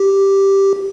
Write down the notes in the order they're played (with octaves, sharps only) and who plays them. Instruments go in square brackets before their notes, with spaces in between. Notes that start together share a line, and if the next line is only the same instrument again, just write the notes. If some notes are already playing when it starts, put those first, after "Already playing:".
Already playing: [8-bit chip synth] G4